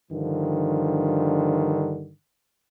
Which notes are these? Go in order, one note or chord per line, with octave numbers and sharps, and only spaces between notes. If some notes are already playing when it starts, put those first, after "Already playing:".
G2 D3 D#3 F3